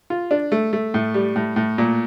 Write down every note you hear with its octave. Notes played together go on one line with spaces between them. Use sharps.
F4
D4
A3
A3
A2
G3
A2
A2
A#2